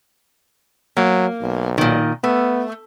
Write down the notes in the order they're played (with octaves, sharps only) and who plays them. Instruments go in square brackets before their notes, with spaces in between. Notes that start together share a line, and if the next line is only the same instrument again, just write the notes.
[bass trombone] F#3 [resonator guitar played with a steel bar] A#3
[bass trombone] B1
[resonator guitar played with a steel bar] A#2 D#3
[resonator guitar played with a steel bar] A3 [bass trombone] B3